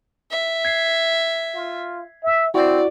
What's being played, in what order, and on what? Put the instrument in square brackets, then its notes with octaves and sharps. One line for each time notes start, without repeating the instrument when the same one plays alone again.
[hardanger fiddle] E5
[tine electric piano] G#6 B6 C7
[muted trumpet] F4
E5
[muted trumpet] C4 [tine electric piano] E4 F#4 [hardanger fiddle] D5